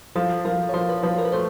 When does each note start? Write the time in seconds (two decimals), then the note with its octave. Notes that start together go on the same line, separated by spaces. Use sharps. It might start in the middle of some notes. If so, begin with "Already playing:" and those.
0.16 F3 A4
0.45 F3 A#4
0.69 C#5
0.74 F3 C5
0.89 B4
1.03 F3 B4
1.18 A#4
1.25 B4
1.32 A3 C5